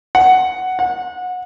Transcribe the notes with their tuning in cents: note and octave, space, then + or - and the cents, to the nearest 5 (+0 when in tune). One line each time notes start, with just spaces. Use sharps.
F#5 +5
F#5 -25